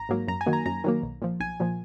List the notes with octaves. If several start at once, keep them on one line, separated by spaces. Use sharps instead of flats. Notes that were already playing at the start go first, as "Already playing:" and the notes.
Already playing: G#1 A#5
G#2 F#3 A#3
F#2 A#5
G#5
D#3 F#3 A#3
A#5
F#2 A#5
D#3 F#3 A#3
B1
A#2 F3
B1 G#5
A#2 F3